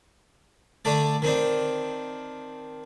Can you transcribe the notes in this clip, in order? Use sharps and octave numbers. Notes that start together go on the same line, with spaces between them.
D3 A3 D4 D5
D#3 C4 D4